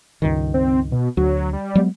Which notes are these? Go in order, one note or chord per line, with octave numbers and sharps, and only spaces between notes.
C#2 G2 D#3
C4
B2
D2 F#3
G3
F#3 G#3 B3